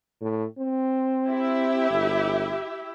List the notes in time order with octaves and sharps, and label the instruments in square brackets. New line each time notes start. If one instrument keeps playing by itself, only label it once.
[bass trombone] A2
C4
[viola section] E4 G4 E5
[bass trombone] G1